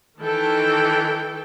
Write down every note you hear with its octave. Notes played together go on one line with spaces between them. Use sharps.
D#3 E3 A4 G5